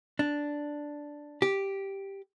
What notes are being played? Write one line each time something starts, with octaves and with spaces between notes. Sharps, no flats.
D4
G4